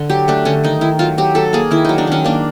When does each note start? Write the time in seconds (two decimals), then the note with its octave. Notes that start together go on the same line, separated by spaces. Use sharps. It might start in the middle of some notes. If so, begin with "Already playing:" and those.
Already playing: D3
0.09 F#3 G4
0.28 A3 D4
0.45 D3 C#4
0.64 D#3 D#4
0.81 D#3 E4
0.99 F#3 F4
1.18 F#3 G4
1.35 F#3 A4
1.53 A#3 G#4
1.71 D#3 E4
1.85 F#3 D#4
1.98 D4
2.07 D#3 C#4
2.24 A#3 D4